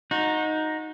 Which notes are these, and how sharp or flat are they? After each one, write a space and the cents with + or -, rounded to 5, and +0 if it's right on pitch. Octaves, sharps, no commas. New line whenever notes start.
D#4 +0 F#4 -30